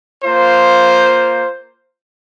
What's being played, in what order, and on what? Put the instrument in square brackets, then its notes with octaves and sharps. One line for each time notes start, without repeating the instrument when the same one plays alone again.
[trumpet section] A#3 F4 C5